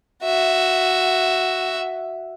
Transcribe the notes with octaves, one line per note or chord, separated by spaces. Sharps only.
F#4 E5